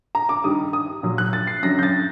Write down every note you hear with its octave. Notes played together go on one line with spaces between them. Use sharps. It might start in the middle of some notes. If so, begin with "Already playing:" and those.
A#5
D6
G2 D#3 G3 D#6
D#6
A#2 F#3
F#6
A6
C7
F#2 D3 F#3 A#6
G6
A6